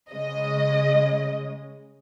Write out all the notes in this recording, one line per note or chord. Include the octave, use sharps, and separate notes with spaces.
C#3 G#3 D#5